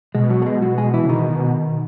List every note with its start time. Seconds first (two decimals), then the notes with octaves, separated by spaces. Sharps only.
0.15 B2 G#3
0.30 F#3
0.42 A3
0.46 G#3
0.62 F#3 F#4
0.78 G#3 G#4
0.94 E3 E4
1.05 C#3
1.09 B2 D#3 D#4